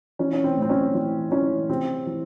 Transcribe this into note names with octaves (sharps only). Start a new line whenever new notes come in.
E3 C#4
C#4
C4
A2
C4
C#4
E3 C4
E3 C#4
C3 C4
E3